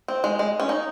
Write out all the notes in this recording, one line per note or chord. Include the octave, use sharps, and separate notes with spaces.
C4
G#3
G#3
C#4
D#4